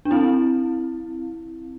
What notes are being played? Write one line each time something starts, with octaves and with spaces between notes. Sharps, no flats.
D4
C4 E4